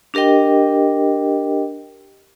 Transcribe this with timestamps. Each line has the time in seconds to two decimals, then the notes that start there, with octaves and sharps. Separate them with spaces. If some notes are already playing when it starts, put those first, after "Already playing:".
0.14 D4 G4 A#4 D#5 G5